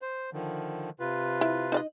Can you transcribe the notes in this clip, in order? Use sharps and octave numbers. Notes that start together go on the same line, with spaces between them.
C5
D3 D#3 F3
C3 F4 B4
E4
D#4 D5 D#5